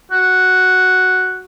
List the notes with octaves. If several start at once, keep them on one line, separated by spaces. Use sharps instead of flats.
F#4